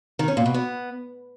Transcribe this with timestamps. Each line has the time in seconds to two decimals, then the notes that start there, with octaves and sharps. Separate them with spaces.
0.19 D#3
0.28 C#4
0.37 A#2
0.46 B2
0.54 B3